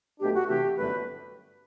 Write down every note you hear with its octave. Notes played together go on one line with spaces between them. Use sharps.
B1 B2 A3 D4 G4
F#4
C3 E3 A3 G4
G1 F#2 D3 A3 B4